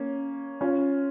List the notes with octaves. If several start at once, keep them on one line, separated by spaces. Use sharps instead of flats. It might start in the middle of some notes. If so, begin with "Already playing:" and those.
Already playing: A#3 C#4
C#4 F4